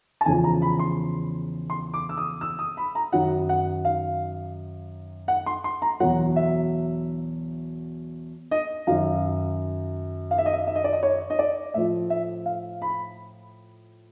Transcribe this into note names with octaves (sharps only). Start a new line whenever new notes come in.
A5
E2 C#3 F3 G#5
A#5
B5
C6
C6
D6
E6
D#6
E6
D#6
B5
A#5
F#2 D#3 F#3 F#5
F#5
F5
F#5
C6
C6
A#5
E2 B2 F#3 F#5
E5
D#5
F#2 D#3 F#3 F5
F5
E5
D#5
E5
E5
D#5
D5
D#5
C#5
D#5
D5
A2 F3 E5
E5
F5
B5